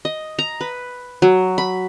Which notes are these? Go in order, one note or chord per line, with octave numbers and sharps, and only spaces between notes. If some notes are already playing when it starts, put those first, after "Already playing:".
D#5
A#5
B4
F#3
B5